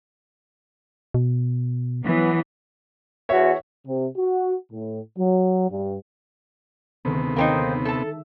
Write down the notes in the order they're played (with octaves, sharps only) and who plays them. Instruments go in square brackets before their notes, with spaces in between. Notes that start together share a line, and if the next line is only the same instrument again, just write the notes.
[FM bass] B2
[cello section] E3 F#3 B3
[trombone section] E2 F#4 [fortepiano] C#5 E5
[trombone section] C3
F#4
A2
F#3
G2
[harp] D2 D#3 G#3 [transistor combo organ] C3 B3
[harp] D#2 [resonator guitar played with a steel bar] A#3 C4 D#4
[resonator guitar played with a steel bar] A4 A5 [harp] E5